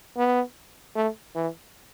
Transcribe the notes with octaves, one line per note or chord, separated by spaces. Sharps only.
B3
A3
E3